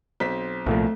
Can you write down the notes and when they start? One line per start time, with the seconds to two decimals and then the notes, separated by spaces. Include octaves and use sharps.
0.20 B1 C4 B6
0.66 C2 A#2 F3 A3